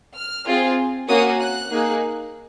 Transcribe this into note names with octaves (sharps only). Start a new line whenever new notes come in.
F6
C4 F4 G#4
A#3 C#4 F#4 D#6
F#6
A#3 D#4 G#4